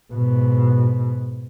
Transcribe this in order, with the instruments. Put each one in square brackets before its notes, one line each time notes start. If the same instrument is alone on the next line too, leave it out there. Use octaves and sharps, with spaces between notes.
[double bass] G#2 B2